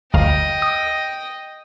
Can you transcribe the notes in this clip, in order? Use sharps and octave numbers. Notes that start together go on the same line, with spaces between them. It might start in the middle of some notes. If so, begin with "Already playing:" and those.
G1 D2 D#5 F5 G5
D#6